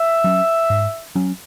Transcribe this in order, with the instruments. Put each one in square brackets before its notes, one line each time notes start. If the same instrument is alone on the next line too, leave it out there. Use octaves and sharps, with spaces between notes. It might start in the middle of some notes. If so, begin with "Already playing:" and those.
Already playing: [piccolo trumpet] E5
[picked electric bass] F#3 C#4
G#2
F#3 C#4